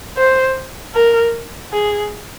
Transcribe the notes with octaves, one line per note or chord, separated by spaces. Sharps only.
C5
A#4
G#4